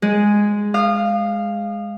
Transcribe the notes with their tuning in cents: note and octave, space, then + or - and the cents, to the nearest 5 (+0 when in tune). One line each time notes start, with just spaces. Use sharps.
G#3 -5 G#4 +0
F5 -5 D#6 -30